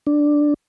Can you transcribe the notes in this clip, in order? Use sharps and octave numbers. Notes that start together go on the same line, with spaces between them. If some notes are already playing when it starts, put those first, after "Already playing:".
D4